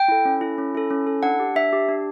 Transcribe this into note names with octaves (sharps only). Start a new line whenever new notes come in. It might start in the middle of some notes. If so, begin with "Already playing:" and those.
Already playing: G5
E4 A4
C#4
E4 A4
C#4
E4 A4
C#4
E4 A4
D4 F#5
G4
D4 E5
G4
D4